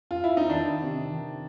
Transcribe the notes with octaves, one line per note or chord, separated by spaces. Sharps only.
F4
E4
D#4
D#3 D4
C3
D#3